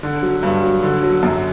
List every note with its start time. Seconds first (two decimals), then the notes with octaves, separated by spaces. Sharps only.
0.03 D3
0.22 F#3
0.43 G2
0.63 F#3
0.83 D3
1.03 F#3
1.23 F#2